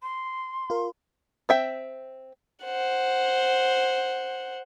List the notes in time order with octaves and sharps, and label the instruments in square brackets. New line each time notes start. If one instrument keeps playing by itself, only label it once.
[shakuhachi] C6
[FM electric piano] F4 A#4
[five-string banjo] C4 E5 G5
[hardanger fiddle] C5 F#5